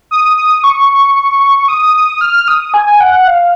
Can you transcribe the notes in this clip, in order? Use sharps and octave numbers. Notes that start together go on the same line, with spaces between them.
D#6
D#6
C#6
D#6
F6
D#6
G#5
F#5
F5